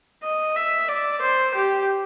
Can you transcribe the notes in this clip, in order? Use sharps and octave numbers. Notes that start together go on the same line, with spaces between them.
D#5
E5
D5
C5
G4